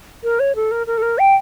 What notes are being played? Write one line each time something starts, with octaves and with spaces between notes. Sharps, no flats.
A#4
C#5
A4
A#4
A#4
A4
A#4
G5